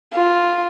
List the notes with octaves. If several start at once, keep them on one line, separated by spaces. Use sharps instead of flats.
F4